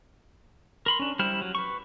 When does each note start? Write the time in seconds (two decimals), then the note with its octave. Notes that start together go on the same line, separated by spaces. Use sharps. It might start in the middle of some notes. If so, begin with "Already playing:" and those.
0.86 A#4 B5 C6
0.99 C#4 D4
1.19 G3 E4 C5 F6
1.41 F#3
1.55 B4 C#6